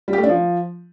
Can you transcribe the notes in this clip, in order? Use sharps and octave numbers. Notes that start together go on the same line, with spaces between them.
G3
G4
A3
D4
F3